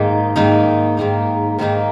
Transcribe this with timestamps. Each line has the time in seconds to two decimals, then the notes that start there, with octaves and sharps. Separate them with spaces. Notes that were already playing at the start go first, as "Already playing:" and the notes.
Already playing: G#2 D#3 A#3 D#4
0.36 G#2 D#3 A#3 D#4
0.97 G#2 D#3 A#3 D#4
1.59 G#2 D#3 A#3 D#4